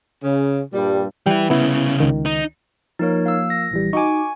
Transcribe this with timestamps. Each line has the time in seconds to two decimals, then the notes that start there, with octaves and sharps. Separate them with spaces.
0.23 C#3
0.73 G2 A#2 G3
1.26 E3 G3 E4 G5
1.50 C2 C#3 B3 E4
2.00 C#2 D#3
2.26 D#4
2.99 F3 A#3 D#4 A#4 C#5
3.26 F5 E6
3.50 A#6
3.71 A#1 E3 G3
3.93 D#4 F#4 G#5 C#6 D6